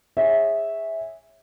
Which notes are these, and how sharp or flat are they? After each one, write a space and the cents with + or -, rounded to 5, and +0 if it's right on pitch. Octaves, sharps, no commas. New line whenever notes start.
G#4 -15 C#5 +0 E5 -10